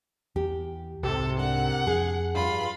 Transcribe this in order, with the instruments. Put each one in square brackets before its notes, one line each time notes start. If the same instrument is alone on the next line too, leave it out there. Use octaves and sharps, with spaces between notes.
[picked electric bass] E2 [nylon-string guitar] G4
[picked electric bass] C2 G#2 [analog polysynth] C3 [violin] A4
[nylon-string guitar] D4 A#4 [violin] F#5
[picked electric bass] F2 [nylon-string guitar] G#4
[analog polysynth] G2 [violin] F4 B5